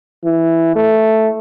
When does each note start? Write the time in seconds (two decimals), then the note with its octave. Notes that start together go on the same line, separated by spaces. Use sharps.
0.25 E3
0.76 A3